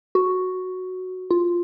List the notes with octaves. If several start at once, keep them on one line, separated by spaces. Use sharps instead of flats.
F#4
F4